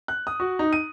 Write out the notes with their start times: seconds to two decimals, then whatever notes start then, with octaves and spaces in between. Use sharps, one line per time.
0.08 F#6
0.27 D#6
0.40 F#4
0.59 D#4
0.73 D#7